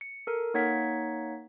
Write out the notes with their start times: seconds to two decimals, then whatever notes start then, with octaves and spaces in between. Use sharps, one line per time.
0.01 C#7
0.27 A4 A#4
0.54 A#3 D#4 C#5 F#5 G#6 B6